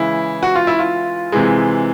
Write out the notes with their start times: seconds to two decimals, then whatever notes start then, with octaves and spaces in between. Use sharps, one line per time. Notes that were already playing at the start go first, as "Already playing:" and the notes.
Already playing: C#3 E3 G#3 E4
0.43 F#4
0.55 F4
0.67 E4
0.79 F4
1.32 C3 E3 G#3